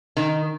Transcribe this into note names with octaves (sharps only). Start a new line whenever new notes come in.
D#3